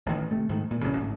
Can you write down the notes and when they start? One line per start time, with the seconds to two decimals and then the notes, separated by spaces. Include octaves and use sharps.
0.06 A1 D#3
0.31 C3 A3
0.49 G#2 D#3 A3
0.71 A#2
0.83 D1 A#1 C#3 C#4
0.97 G#1 A2